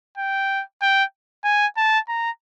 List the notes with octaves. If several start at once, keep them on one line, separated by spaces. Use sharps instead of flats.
G5
G5
G#5
A5
A#5